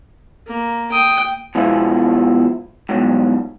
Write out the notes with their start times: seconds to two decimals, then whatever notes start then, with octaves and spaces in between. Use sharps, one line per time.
0.47 A#3
0.92 G5 D#6
1.55 B2 F3 G#3 B3 E4 F4
2.89 G#2 B2 D3 F#3 G3